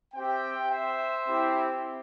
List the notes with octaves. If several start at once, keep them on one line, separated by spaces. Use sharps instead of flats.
C4 G4 E5 G5
C5 E5
C4 E4 G4